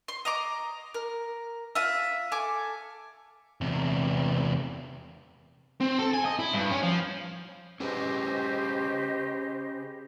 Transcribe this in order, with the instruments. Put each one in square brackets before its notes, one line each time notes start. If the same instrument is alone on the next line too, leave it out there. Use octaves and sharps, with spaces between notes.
[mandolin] C6
D#5 A#5 D6
A#4
F4 E5
A4 G#5 D6
[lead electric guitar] E2 C3
[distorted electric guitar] C4
A4
G#5
D#5
E4
G2
C#4
F3
[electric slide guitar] C#4 G#4 B4 [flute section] G4 C5 D#5